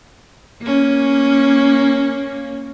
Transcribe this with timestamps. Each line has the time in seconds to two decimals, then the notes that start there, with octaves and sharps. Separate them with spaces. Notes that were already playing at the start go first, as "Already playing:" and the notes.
0.62 A#3 C#4